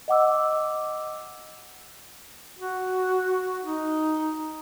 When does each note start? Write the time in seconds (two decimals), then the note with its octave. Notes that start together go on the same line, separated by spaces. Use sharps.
0.08 D#5 F#5 D6 E6
2.59 F#4
3.63 D#4